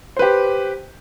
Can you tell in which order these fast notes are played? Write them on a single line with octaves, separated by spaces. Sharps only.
C5 B4 G4